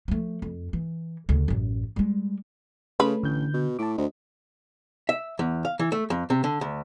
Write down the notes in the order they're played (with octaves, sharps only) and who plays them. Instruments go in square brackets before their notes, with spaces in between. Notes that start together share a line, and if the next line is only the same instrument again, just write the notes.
[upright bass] F3 A3
F2
E3
D2 C#3
A1 F#2
G3 G#3
[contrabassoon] C#3 [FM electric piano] A3 C#4 A4 [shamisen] B4
[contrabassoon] A1 [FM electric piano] D3 G6
[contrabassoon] B2
[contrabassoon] A2 [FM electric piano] A5 D6
[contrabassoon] D2 [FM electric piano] C5 D#5
[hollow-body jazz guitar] E5
E2
F5
E3
A3
F2
C3
D3
D2